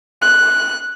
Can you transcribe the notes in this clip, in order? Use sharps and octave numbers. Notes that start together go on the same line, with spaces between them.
F#6